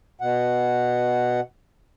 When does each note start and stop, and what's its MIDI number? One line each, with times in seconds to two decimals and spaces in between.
0.21 1.40 47
0.21 1.40 78